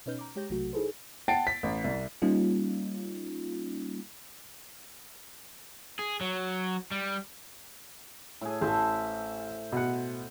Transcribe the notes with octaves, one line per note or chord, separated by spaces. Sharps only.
B2 C#4 D#4 B4 F6 G6
A#5 D6
G#3 G4 C#5 G6 A#6
B1 C3 F#3 A3 F#4
D#4 E4 G#4 A4 B4 C5
F#5 G5 A5 A6 C7 D7
B6
A1
C2
G3 A#3 C#4 D#4 F4
G#4
F#3
G3
A2 G#4
A1 C5 E5 A5
B2 F#5